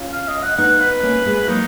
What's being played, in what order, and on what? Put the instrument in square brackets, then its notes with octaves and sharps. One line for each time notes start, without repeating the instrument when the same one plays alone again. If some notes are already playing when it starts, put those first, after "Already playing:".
Already playing: [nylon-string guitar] C#4 F4
[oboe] F5
D#5
F#5
[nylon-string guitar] B3 D#4 [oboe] F#5
[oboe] B4
[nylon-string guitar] A#3 C#4
G#3 B3
[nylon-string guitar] F#3 A#3 [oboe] D#4